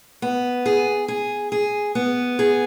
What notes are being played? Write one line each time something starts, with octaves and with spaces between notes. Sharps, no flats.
B3
G#4
G#4
G#4
B3
G#4